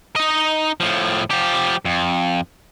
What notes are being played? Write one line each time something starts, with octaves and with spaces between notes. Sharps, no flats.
D#4 D#5
A2 F3
F3 G4
F2